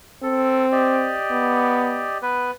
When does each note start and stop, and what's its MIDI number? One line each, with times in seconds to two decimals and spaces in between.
0.23 1.15 60
0.23 0.66 69
0.72 2.18 67
0.72 2.18 74
0.72 2.18 75
1.32 2.08 59
2.22 2.51 59
2.22 2.51 71